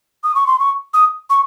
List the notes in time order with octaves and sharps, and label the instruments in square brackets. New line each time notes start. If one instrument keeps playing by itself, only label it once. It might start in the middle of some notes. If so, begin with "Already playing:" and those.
[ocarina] D#6
C#6
C6
C#6
D#6
C#6